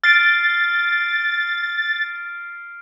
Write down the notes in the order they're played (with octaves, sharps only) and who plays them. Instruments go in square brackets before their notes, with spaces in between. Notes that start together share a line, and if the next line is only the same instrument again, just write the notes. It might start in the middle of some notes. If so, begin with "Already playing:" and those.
[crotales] F6 C7 D7 [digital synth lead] A6